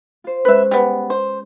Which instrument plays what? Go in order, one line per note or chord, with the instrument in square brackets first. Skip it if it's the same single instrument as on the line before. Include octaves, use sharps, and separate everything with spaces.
[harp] F4 C5
[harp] G#3 C#4 F#6 [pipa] B4 E5
[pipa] G3 B3
C5